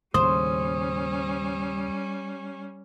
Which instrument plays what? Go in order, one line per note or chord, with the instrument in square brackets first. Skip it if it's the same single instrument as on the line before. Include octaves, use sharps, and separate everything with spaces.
[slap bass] D#2 A2 C#3 [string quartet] G3 C#4 [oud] C5 [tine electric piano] D#6